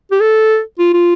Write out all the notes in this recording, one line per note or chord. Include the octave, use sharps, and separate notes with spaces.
G4
A4
F4
F4